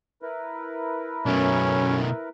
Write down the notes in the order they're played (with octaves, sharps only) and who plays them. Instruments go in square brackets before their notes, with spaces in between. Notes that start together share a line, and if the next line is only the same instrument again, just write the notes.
[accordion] E4 A#4 B4
[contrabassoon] F#2 [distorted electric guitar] B2 A3 [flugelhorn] C#4